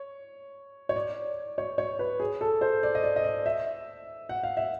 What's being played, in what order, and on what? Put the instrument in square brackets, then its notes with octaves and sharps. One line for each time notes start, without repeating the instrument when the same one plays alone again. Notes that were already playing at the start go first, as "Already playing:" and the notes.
Already playing: [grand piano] C#5
C#5
D5
C#5
C#5
B4
G#4
A4
C5
D5
D#5
D5
D#5
D5
E5
F#5
F5
E5